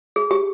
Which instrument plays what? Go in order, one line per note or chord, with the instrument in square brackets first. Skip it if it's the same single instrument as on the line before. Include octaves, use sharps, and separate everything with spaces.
[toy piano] G#4
G4